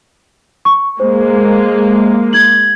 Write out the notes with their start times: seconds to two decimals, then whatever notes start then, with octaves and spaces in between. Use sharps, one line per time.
0.65 C#6
1.00 G#3 A#3 C5
2.33 G#6 F#7